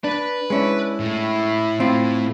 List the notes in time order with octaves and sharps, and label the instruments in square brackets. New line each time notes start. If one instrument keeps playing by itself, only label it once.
[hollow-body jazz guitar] D4 [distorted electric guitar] B4
[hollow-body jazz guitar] G#3 C#4 D4 [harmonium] E4
[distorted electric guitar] A2
[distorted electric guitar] A2 [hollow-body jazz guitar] C4 F4